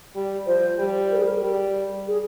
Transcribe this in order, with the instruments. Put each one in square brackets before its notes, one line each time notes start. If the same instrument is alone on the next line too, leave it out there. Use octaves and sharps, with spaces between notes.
[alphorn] G3
[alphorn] F3 [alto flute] C5
[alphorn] G3
[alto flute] A#4
G#4
A#4
[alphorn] G3
[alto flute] G#4